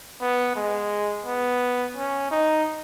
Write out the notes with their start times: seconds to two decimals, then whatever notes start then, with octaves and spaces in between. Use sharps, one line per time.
0.21 B3
0.56 G#3
1.26 B3
1.96 C#4
2.31 D#4